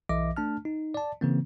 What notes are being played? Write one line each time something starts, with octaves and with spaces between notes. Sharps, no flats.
B1 E3 D#5 E5 D6 A#6
A3 D4 A5 F6
D#4
D5 A5
C#3 E3 A#3 C4